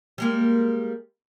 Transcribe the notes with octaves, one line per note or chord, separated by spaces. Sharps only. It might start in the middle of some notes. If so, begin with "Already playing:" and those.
G3 G#3 A#3